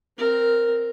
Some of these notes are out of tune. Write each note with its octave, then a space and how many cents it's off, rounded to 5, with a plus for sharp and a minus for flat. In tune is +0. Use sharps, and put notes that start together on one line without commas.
C4 +0 A#4 +0